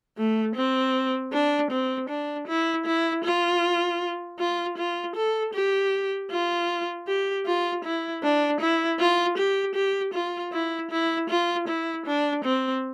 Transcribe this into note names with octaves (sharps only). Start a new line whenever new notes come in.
A3
C4
D4
C4
D4
E4
E4
F4
F4
F4
A4
G4
F4
G4
F4
E4
D4
E4
F4
G4
G4
F4
E4
E4
F4
E4
D4
C4